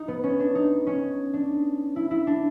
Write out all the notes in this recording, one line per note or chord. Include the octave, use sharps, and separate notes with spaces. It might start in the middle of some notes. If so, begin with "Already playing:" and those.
Already playing: D#4
B3
C#4
D4
D#4
C#4
D4
E4
E4
D4